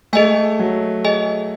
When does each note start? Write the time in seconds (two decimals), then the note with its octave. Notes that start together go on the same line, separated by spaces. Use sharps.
0.13 A3 G#4 D#5 G#5
0.59 F#3
1.05 G#4 D#5 G#5